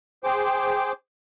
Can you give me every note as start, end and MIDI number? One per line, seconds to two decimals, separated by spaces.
0.24 0.92 68
0.24 0.92 72
0.24 0.92 79
0.24 0.92 86